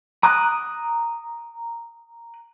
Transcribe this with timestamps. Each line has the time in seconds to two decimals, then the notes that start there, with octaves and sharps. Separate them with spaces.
0.23 A#5 D6 D#6 F#6